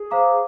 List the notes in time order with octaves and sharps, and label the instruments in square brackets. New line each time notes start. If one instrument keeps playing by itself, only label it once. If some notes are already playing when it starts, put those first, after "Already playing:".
Already playing: [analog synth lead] G#4
[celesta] C5 F5 A#5 D6